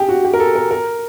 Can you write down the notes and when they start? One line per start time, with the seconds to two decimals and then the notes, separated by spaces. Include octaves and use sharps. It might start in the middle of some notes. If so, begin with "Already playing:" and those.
Already playing: G4 G#4
0.09 F#4
0.25 G4
0.34 A#4
0.40 A4
0.55 A#4
0.71 A#4